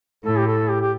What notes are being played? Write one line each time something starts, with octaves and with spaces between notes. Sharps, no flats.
A2 A4
G4
A4
G4
G4